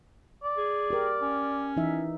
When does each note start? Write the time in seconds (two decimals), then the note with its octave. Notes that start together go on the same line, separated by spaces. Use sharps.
0.43 D5
0.57 G#4
0.90 G4 A#4
1.22 C#4
1.77 E3 D#4 E5